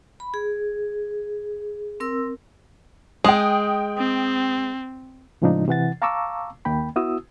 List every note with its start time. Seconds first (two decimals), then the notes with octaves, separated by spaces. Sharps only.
0.20 B5
0.34 G#4
2.00 C4 A#4 E6
3.24 G#3 G5 D#6
3.98 C4
5.42 A2 C#3 F3 G#3 D4 D#4
5.68 C3 E3 F#5 A6
6.02 F5 A5 A#5 C#6 D6 E6
6.65 D#2 D#3 A#3 G5 B5
6.96 B3 E4 F#4 D#6 E6